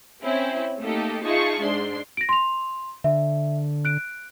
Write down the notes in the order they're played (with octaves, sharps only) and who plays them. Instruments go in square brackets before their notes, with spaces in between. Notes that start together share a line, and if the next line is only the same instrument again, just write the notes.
[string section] C4 C#4 E4
A3 A#3 D#4 G4 A4
D#4 F4 G#4 E5 A5 C#6
G#2 D4 C6
[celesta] A#6 D7
C6 F7
[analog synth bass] D3 [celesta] E5
[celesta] F#6 D7